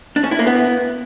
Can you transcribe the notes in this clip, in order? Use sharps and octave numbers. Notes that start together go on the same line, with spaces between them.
D4
C#4
E4
A#3
B3